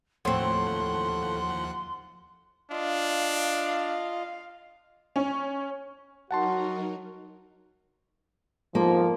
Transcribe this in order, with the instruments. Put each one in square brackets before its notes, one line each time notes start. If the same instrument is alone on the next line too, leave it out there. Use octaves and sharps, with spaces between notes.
[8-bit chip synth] D#2 F3 F#5 [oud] A2 C4 [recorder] C6
[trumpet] D4 [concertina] F4 D#5 [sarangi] F5
[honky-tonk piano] C#4
[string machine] F#3 D#4 A#4 [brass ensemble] F#4 [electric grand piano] F#5 A5 C6
[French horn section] F2 G#2 F3 [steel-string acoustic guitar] A#3